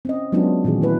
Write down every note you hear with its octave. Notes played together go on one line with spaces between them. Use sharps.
C4 C#4 D#5
F#3 G#3 B3 C#4 D4 F4
A#2 D#3 E3 F#4 G#4
A3 E4 B4